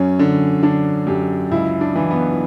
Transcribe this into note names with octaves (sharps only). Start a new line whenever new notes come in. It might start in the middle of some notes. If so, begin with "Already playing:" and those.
Already playing: F#2 C#4
D3
D3 D4
F#2 G4
C#2 E4
D4
E3
B3